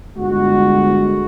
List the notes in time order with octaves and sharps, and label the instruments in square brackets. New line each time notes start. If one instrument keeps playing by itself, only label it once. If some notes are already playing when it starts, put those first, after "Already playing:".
[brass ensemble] G1 G#3 F#4